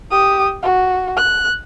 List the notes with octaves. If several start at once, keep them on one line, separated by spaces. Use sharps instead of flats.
G4 D#6
F#4
F#6